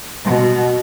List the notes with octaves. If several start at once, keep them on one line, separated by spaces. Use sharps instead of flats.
B2